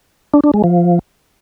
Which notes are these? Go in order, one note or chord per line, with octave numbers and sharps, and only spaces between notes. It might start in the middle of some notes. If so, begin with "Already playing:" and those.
D4
D4
G#3
F3